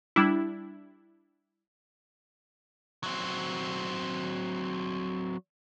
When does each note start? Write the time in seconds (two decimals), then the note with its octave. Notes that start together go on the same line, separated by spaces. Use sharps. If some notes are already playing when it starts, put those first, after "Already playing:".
0.16 G3 D4 E4
3.04 F#3 C4